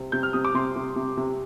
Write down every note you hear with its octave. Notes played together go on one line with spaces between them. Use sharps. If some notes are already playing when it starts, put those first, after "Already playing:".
Already playing: C3 C4
C3 G6
F6
C3 D#6
D6
C3 C6
C3
C3
C3